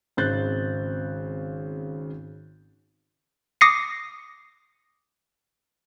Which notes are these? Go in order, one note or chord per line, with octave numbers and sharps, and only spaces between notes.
G#1 C#3 C4 F#6 G6 A6
D6 D#6 A#6 C7 C#7